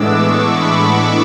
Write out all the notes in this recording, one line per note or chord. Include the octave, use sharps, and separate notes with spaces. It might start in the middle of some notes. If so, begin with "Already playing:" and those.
Already playing: A2 E3 G#3 B3 D4 D6 E6
C#6
B5
C#6